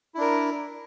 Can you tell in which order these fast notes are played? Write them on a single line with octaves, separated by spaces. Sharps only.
E4 D4 A#4